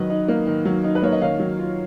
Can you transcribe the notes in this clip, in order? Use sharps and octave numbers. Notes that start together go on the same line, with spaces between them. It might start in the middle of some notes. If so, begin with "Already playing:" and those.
Already playing: D#3 F#3 B4 D#5
D#4
A#3
D#3
F#3
D#4
B4
A#3 C#5
D#5
D#3 C#5 F5
F#3
F4